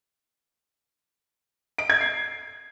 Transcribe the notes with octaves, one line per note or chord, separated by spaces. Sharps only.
D7
G#6
C7